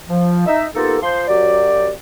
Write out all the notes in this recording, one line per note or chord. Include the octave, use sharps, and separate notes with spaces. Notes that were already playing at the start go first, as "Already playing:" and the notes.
F3
D#4 E5
A#3 B3 D#4 F4 G4 A4
F3 C5 C6
F#2 F#3 G4 D5